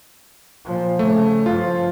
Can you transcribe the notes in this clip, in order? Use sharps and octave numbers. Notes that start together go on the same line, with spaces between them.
A#2 F3
C#3 A3
G2 F3 F4